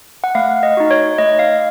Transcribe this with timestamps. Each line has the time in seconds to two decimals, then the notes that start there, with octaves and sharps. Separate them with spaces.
0.24 F#5
0.35 A3 F5
0.63 D#5
0.77 D#4 F#4
0.91 C#5
1.18 A3 D#5
1.39 F5